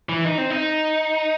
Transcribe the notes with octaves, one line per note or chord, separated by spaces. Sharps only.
E3
D#4
C4
D#4